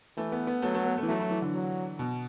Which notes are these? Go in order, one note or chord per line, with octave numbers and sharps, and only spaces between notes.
E3 A3
B3
B3
F#3 A3
A3
B3
A3
E3
F#3 A3
F#3
E3
D3
F#3
B2